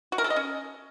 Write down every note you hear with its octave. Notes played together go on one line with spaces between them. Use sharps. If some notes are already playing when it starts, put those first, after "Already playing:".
F#4
A#4
A4
D#5
C#4